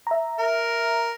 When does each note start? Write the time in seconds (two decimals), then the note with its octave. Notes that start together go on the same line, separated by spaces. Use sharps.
0.07 E5 A#5
0.39 A#4